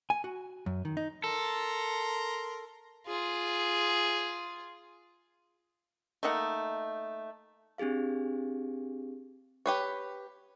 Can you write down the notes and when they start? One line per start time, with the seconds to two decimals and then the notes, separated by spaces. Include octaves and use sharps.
0.10 G#5
0.24 F#4
0.66 F#2
0.85 D#3
0.97 D#4
1.24 A4 A#4 A#5 C6
3.07 F4 G#4
6.23 A3 A#3 D#4 F#5
7.78 C4 D4 G4 G#4 F5
9.66 G4 B4 C#5